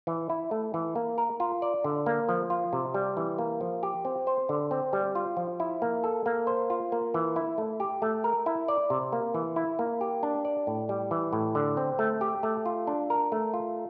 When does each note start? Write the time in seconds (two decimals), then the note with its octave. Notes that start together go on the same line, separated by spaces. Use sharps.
0.07 E3
0.30 E4
0.51 A3
0.74 E3
0.96 A#3
1.18 A#4
1.40 F4
1.62 D5
1.84 D3
2.06 A#3
2.29 F3
2.50 F4
2.73 C3
2.94 G3
3.17 E3
3.38 A#3
3.61 F3
3.83 G4
4.05 C4
4.27 C5
4.49 D3
4.71 C4
4.93 G3
5.15 F4
5.37 F3
5.60 E4
5.82 A#3
6.04 A4
6.26 A#3
6.47 C5
6.70 F4
6.92 A#3
7.14 E3
7.36 E4
7.58 A3
7.80 G4
8.02 A3
8.24 A#4
8.46 E4
8.68 D5
8.90 C3
9.12 A#3
9.34 E3
9.56 E4
9.79 A#3
10.01 G4
10.23 D4
10.45 D5
10.67 A2
10.89 G3
11.11 E3
11.33 A2
11.55 D3
11.77 C4
11.99 A3
12.21 G4
12.43 A3
12.66 F4
12.87 D4
13.10 A#4
13.32 A3
13.54 F4